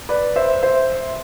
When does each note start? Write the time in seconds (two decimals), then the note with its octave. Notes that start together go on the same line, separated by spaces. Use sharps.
0.09 B4 D5
0.36 C5 E5
0.63 C5 E5